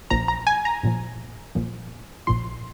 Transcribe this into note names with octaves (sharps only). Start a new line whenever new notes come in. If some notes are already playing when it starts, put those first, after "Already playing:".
A#1 A#2 F3 A#5
A#5
G#5
A#5
A#1 A#2 F3
A#1 A#2 F3
A#1 A#2 F3 C6